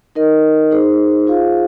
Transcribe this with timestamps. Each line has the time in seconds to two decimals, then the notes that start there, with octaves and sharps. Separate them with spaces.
0.15 D#4 A#4 D#5
0.71 D#4 G#4 C5
1.27 F4 G#4 C5 F5